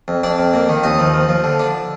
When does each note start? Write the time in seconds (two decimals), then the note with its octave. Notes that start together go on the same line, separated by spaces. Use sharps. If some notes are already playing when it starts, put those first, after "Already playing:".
0.08 F2
0.23 F2 D4 D5
0.39 F2
0.53 A#3
0.69 D#3
0.83 D#2 D#4 D#5
0.99 F3
1.14 F3
1.29 F3
1.44 D3
1.59 D4